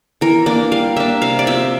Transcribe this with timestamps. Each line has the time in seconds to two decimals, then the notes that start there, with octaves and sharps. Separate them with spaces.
0.21 E3 A#4
0.46 A#3 D4 D5
0.71 G3 F5
0.96 A#3 D4 E5
1.22 C3 F5
1.39 D5
1.47 F3 C4 E5